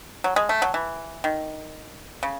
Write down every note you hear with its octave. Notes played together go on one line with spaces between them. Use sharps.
F#3
G#3
A3
F#3
E3
D#3
C#3